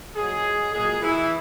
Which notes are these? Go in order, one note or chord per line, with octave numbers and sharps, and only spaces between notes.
A#2 F#3 G#3 G#4
A#2 F#3 G#3 G#4
E3 E4